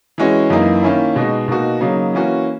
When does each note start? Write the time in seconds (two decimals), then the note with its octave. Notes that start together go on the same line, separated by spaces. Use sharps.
0.18 E3 G#3 C#4 F#4
0.50 F#2 E3 A#3 D#4
0.83 D#3 A#3 C#4 E4
1.16 B2 G#3 D#4 F#4
1.48 B2 A#3 D#4 F#4
1.81 C#3 F#3 A#3 D#4
2.14 E3 A#3 C#4 F#4